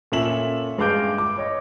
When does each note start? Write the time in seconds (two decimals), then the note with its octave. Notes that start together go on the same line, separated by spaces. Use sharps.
0.12 A#2 C#4 A4 E5 E7 F#7
0.78 G2 G#3 F5 D6 G6 D7
1.18 D6
1.37 C#5 D#5